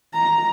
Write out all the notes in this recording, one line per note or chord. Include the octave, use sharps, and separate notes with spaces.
A#5